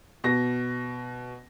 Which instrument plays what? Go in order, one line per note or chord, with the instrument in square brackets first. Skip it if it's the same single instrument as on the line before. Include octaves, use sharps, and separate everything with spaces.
[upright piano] B2 A#6